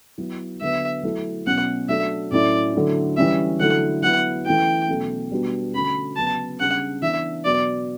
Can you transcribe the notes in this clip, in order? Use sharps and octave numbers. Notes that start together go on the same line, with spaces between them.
F#3 B3 E4
D3 F#3 B3 E5
F#3 A3 E4
B2 F#3 C#4 F#5
F#3 A3 D4 E5
A2 F#3 A3 C#4 E4 D5
D3 F#3 A3 E4
E3 G3 C#4 E5
D3 F#3 A3 E4 F#5
F#3 B3 E4 F#5
E3 A3 C#4 E4 G5
B2 F#3 A3 C#4
B2 G3 B3 D4 F#4
D3 A3 C#4 F#4 B5
C#3 F#3 B3 A5
C#3 G3 D4 F#5
E3 B3 D4 E5
B2 F#3 B3 F#4 D5